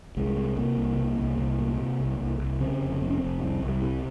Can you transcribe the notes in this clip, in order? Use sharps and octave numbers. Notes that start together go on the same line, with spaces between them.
C2 G#3
C3
C3 A#3
C2
C2
C2
C2
A#2
C3
C2
C2
C2
C#3 C4
F1
F1 C4
C#4
F1 C4
C2 C4
C2
G3
C3